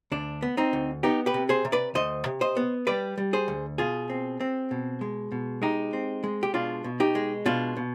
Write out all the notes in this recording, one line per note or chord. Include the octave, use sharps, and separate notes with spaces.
D2 D4
B3
C4 D#4
D2
B3 D#4 G4
G4 B4
C3
G#4 C5
C3
B4 D5
D2 C5 D#5
C3
C5 D#5
B3
G3 B4 D5
G3
G#4 C5
D2
B2 F4 G#4
C4
C4
B2
G#3
B2
G#3 D#4 G4
C4
G#3
G4
B2 D4 F4
B2
D#4 G4
G#3
B2 D4 F4
B2